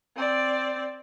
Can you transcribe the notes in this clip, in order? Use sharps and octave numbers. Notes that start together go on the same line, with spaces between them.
C4 D5